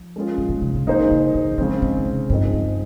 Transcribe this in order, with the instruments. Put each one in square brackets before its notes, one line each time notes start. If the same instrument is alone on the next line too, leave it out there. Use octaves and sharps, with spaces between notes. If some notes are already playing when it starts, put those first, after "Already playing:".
Already playing: [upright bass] F3
[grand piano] G#3 C#4 F4 G#4
[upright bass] G#2
A#2
C3
C#3
[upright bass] D#3 [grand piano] A#3 D#4 G#4 C5
[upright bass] C#3
D#3
D#3
[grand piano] C#3 G#3 C4 [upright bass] F3
[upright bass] D#3
C3
[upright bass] G2 [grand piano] F3 C4 D#4 G#4 D#5
[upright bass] G2